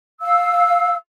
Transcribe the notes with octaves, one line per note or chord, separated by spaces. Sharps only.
F5 E6